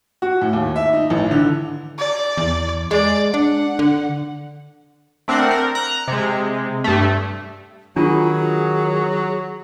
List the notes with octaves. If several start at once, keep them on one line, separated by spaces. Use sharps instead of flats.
F#4
A2
D#2
E5
D#4
A1
D3
D5
E2
G#3 D5
D4 F#5
D3
A3 C4 D4 A#4 F#5
A#4
A#5 F#6
C3 G#3
G2 A3
D#3 F#3 D4 F4 G#4